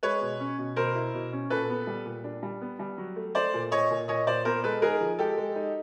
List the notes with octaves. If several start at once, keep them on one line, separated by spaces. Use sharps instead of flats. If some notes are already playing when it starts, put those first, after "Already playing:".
G#3 B4 C#5
B2
C#4
B2
B2 A#4 C5
E4
B2
C#4
A#2 A4 B4
B3
G3
A#2
D4
G3
B3
G3
F#3
A3
A3 C5 D5
A#2
A#2 C#5 D#5
A#2
A#2 C#5 D#5
A#2 C5 D5
B3 A#4 C5
G#3 A4 B4
D#4 G#4 A#4
F3
G#3 G4 A4
G#3
D#4